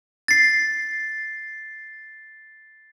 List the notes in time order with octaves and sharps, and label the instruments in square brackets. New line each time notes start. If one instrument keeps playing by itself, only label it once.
[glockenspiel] A6 C7